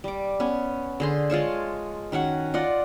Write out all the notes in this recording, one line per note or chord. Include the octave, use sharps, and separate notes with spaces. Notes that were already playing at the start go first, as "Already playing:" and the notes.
G3 D6
B3 C#4
D3 G#4 C6
G#3 F4 C#5 A5
D#3 C#4 F#4 F#5
F4 D5 D#5 F#5